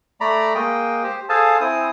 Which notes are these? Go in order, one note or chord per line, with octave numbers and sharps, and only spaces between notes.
A3 D5 A#5 B5
G#3 A#3 D#5 G5
G4 C5
G#4 A4 C5 F5 G#5 A5
C4 E4 C5 G#5 D#6